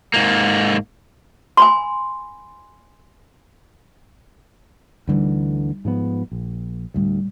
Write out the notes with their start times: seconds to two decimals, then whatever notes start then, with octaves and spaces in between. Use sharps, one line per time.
0.14 G#2 A#3
1.57 G#5 B5 C6
5.07 D2 D3 E3 G3 D#4
5.85 G#2 F3 B3
6.31 A#1
6.94 D2 A2 G3